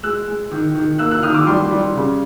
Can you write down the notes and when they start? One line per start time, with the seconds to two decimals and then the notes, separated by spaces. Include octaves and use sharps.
0.03 G#3 E6 F#6
0.28 G#3
0.51 D#3
0.75 D#3
0.98 A#3 E6 F#6
1.11 E6 F#6
1.23 D#3 D#6 F6
1.34 D6 E6
1.47 G3 C6 D6
1.71 G3
1.95 C#3